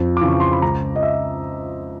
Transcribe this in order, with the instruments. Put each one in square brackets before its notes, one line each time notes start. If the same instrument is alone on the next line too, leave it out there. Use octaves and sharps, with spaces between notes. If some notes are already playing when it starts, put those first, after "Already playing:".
Already playing: [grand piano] F2
C#3 E3 D6
C#6
C6
B5
C#2 A#5
D#5
E5